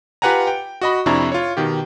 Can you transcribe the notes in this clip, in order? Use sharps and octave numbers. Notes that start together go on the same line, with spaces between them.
F4 G4 B4 F#5 G#5 A#5
G5
F#4 D#5 B5
F2 C3 D4 E4 A#5 C#6
F4 C#5
B2 D#3 G4